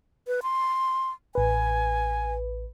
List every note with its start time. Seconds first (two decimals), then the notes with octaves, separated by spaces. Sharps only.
0.27 B4
0.43 C6
1.35 A1 B4 G#5